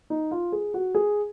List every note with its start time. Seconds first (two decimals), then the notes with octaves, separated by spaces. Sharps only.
0.10 D#4
0.31 F4
0.52 G#4
0.74 F#4
0.95 G#4